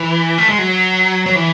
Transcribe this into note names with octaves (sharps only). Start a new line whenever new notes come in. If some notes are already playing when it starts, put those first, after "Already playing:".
Already playing: E3
A3
G#3
F#3
F#3
E3